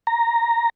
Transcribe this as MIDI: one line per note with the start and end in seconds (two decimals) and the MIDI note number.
0.07 0.70 82